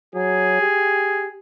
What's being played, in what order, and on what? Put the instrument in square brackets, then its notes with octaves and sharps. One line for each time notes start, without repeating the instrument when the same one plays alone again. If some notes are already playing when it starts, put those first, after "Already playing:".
[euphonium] F#3 [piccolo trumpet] G#4
[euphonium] G4